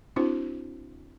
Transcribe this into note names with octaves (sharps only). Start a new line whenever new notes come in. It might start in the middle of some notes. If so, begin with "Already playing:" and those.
C4 D4 E4 F#4 C5